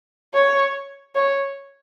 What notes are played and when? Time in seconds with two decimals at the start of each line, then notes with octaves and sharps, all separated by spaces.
0.34 C#5
1.15 C#5